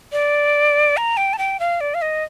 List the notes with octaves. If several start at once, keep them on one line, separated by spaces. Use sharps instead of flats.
D5
A#5
G5
A5
G5
F5
D5
F5
D#5